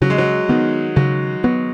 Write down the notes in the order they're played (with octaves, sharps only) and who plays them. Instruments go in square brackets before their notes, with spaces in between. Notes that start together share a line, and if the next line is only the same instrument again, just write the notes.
[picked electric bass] C#3 [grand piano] F#3
[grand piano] G#3
F#3
[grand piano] D#3 [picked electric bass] B3
[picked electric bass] C#3 [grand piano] F#3
[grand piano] F#3 [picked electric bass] B3